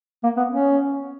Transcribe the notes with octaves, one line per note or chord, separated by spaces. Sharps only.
A#3
B3
C#4